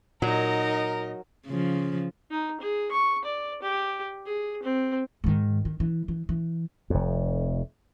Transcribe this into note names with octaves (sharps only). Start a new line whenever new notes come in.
A#2 F#3 D#4 A#4 D#5
C#3 F3
D#4
G#4
C#6
D5
G4
G#4
C4
G#2 D#3
D#3
E3
E3
E3
F1 F2